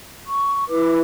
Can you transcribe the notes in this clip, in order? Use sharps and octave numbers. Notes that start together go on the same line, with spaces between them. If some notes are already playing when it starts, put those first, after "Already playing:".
C#6
E4 B4 D6